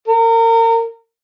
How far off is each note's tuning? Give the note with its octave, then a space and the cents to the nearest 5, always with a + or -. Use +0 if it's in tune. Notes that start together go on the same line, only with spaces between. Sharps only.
A#4 -35